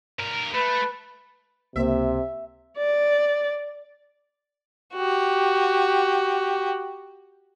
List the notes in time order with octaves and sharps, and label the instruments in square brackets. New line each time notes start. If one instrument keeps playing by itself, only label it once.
[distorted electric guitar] G2 A#4
[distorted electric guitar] A3 [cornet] B4
[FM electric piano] C#2 A#3 C5 [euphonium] C3 [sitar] E5
[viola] D5
[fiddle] F#4 G4